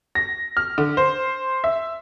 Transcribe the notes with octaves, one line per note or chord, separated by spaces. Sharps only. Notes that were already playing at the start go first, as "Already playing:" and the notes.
A#6
F6
D3
C5
E5